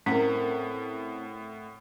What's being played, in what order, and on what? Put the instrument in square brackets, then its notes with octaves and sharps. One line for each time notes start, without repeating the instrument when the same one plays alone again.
[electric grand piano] A2 F#5 [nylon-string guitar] A3 C4 A#4 [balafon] C#4